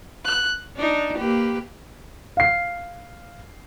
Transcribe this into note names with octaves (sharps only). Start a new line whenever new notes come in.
F#6
D4 D#4
A#3 G4 B4
F5 C7